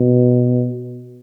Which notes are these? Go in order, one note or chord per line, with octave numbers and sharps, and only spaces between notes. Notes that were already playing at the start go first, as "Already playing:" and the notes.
Already playing: B2